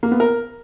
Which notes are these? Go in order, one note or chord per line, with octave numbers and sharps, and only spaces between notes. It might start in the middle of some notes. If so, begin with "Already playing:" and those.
A#3
B3
A#4